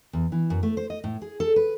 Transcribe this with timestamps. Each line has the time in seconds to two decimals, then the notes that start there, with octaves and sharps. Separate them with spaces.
0.13 E2
0.32 E3
0.50 F#2
0.63 A3
0.77 C5
0.90 D#5
1.04 A2
1.22 G#4
1.40 A4
1.56 B4